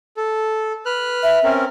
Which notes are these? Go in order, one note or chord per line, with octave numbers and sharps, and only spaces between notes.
A4
B4 F6 F#6
E5
C4 C#4 A#4